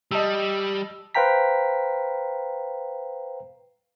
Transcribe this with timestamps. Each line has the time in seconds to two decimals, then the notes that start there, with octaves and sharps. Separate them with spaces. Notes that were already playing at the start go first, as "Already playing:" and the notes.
0.11 G3 D#5 A5 E6
1.15 B4 C5 F5 G5 A#5 B6